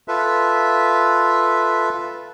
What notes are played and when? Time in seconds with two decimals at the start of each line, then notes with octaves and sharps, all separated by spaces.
0.08 F4 A4 B4 E5